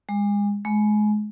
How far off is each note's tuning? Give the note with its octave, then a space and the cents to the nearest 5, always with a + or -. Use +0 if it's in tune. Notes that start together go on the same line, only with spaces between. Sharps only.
G#3 -30
G#3 +25